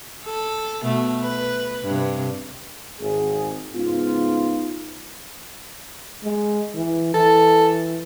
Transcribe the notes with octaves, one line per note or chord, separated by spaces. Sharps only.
A4
B2 A3
B4
G2 C3
G#1 G#4
G#2 C#3 B3 D#4 F4
G#3
E3
E3 A4